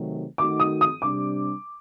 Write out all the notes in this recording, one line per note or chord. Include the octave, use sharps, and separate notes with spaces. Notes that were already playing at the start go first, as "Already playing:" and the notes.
Already playing: C3 D#3 F#3 A3
D#3 A3 D#4 F#4 D6
D#6
D#6
C3 G3 D4 D6